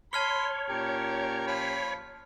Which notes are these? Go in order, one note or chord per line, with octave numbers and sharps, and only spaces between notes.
C#5 A5 B5 C6 F6 G7
A#2 C#4 G4 A#4
F3 B5